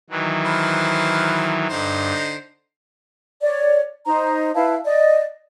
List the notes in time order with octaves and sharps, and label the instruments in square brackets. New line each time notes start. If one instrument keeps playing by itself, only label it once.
[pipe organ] D#3 E3 F#3
[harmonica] B4 C5 F6
[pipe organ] G2 [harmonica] D3 D#4 C5
[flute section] C#5 D5
D#4 C5 A#5
E4 B4 F5 A5
D5 D#5